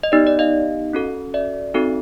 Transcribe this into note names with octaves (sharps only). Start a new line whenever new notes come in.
D#5
B3 D#4 G4 D5
D5
D#5 F5
C#4 F#4 A4
D5 E5
C4 D#4 F#4 A4